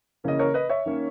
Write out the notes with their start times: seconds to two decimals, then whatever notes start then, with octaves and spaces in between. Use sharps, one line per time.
0.24 C#3 E3 A#3 C#4 D#5
0.39 A#4 C#5
0.54 B4 D#5
0.69 C#5 E5
0.86 D#3 A#3 C#4